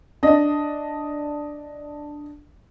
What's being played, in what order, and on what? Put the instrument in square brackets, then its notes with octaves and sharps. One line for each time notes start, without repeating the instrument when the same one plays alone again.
[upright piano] D4 D#5